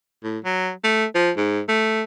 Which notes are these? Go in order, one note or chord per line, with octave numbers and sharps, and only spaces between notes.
A2
F#3
A3
F3
G#2
A3